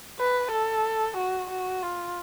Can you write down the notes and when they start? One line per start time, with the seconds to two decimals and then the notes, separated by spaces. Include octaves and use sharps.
0.19 B4
0.52 A4
1.17 F#4
1.50 F#4
1.82 F4